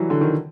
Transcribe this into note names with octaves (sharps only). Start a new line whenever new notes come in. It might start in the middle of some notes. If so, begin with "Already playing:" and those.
Already playing: E3 F#3 G3
D3
D#3